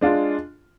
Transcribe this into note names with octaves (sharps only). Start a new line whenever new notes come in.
G#3 D4 F4